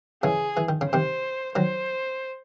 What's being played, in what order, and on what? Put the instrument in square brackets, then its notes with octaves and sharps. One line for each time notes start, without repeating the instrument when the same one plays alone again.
[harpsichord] C#3 E3 [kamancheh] G#4
[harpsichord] E3
D#3
C#3
[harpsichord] C3 D#3 [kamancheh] C5
[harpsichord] D#3 F#3 [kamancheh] C5